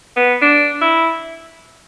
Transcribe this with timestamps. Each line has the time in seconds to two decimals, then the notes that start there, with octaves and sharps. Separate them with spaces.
0.16 B3
0.41 D4
0.81 E4